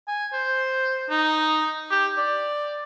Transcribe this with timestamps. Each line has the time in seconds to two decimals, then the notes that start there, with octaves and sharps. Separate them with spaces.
0.08 G#5
0.33 C5
1.10 D#4
1.91 G4
2.17 D5